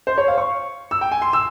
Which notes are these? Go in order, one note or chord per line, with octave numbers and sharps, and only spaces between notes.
C5
C#5
F5
C#6
E6
G5
G#5
C6
E6